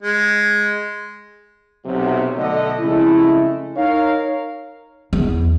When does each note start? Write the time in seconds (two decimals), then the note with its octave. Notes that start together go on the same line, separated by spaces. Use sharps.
0.03 G#3
1.86 B1 C3 F#3
2.37 B1 D3 A3 D#5
2.80 F2 C#3 G#3 A3 E4
3.77 D#4 A#4 C#5 F5
5.13 E2